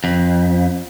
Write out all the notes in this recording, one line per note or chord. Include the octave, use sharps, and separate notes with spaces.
F2